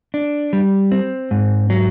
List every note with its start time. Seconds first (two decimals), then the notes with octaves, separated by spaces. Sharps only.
0.14 D4
0.53 G3
0.92 C4
1.31 G#2
1.70 F#3